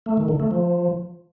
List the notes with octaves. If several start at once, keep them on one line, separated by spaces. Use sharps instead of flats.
A3
D#3
D3
A3
F3